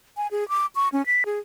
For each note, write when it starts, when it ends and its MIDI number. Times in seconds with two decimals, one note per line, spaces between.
0.17 0.27 80
0.31 0.48 68
0.49 0.66 86
0.75 0.88 85
0.93 1.05 61
1.06 1.24 95
1.26 1.39 68